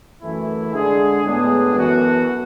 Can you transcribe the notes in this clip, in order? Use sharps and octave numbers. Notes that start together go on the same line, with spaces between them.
F#2 E3 A3 E4
D3 G#3 D4 G#4
A2 G#3 B3 D4 G#4
F#2 E3 B3 F#4 A4